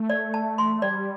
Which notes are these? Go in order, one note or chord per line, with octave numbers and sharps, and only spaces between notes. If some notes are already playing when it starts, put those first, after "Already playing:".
Already playing: A3
D5
A5
C6
G3 D5